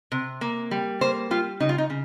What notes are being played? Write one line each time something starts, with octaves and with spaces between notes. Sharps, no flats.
C3
A#3
G3
A#3 C5
G3 F4
C#3 D#4
F4
D#4
C#3